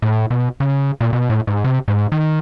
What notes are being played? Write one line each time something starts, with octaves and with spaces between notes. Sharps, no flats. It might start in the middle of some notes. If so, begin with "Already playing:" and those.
A2
B2
C#3
A#2
B2
A2
G#2
C3
G#2
D#3